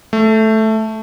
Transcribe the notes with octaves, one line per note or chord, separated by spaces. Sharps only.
A3